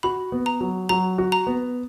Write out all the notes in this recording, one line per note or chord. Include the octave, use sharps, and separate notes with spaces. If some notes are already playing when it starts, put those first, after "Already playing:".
F#4 B5
B3
A#5
F#3
F#3 A#5
F#4
A#5
B3